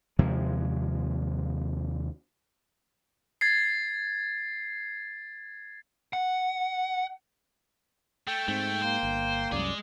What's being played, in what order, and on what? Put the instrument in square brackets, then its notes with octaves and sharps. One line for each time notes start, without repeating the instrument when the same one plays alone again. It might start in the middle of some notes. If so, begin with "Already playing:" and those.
[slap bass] D#2 C3 F3 G#3
[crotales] G#6 A6 C7
[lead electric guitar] F#5
[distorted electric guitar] A3 [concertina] G5
[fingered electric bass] G#2 [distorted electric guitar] A3 [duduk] C4
[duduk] A#3 [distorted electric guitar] C5
[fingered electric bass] G1
[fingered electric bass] C2 F#2 [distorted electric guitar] G#3 G#4 [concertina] D5